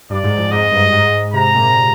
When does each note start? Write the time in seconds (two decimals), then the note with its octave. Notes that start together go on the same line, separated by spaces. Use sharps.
0.10 G2 D5
0.24 G#2
0.38 F2
0.51 G#2 D#5
0.72 G2
0.92 G#2
1.34 C3 A#5
1.55 A#2